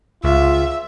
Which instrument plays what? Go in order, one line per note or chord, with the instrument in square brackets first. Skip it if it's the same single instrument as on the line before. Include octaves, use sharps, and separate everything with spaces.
[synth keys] C#2 [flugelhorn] F4 [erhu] E5